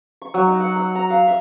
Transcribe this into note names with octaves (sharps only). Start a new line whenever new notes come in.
C#6
F#3
D#4
F#5
E6
A#5
F5
E5